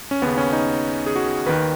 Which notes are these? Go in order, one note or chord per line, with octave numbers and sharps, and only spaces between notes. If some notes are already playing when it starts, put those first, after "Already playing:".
C#4
D#2 C#3 B3
C#4
D#4
G#4
F#4
D#2 D#3 B4